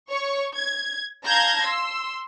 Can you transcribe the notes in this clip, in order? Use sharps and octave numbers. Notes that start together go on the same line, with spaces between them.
C#5 C#6
G#6
F5 A5 A#5 G6 G#6 A#6
C6 E6